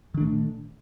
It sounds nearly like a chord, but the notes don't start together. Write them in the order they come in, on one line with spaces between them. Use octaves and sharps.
D#3 D4 A3 A#2